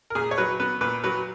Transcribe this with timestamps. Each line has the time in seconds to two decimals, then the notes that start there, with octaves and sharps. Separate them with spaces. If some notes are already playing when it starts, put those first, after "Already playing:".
0.10 A#4
0.15 A#2 G#4
0.31 C#5
0.38 F#3 B4
0.60 B3 B4
0.81 A#2 B4
1.04 F#3 B4